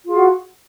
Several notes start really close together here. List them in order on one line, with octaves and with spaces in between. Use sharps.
F4 G#4 F#4